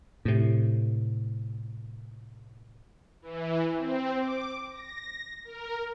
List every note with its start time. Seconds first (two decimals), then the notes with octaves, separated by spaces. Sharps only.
0.25 A2 C3
3.22 E3
3.76 C4
4.17 D6
4.70 A#6
5.44 A#4